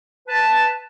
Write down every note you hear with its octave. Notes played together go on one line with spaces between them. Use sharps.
B4 A5